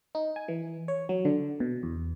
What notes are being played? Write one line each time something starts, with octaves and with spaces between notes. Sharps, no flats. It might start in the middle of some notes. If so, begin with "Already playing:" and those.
D#4
G#5
E3
C#5
F#3
D3
B2
E2